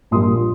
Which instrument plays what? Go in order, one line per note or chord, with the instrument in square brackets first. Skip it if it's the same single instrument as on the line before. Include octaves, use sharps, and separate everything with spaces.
[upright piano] A#1 A#2 G3 C6 D#6